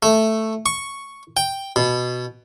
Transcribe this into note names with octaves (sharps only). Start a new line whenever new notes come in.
A3
C#6
G5
B2